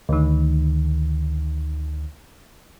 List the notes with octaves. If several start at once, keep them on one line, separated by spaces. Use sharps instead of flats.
D2 D#3